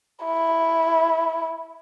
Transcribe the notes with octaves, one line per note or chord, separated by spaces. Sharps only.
E4